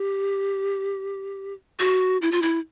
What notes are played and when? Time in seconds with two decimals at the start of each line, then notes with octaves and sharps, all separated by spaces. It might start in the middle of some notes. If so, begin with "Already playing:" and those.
Already playing: G4
1.80 F#4
2.22 E4
2.32 F4
2.42 E4